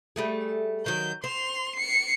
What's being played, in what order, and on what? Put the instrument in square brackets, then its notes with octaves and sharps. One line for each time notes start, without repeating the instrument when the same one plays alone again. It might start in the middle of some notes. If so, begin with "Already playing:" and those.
[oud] G3 A3 G#4
[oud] D#3 F#3 [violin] G6
[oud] C5 [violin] C6 F7
[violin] C7 C#7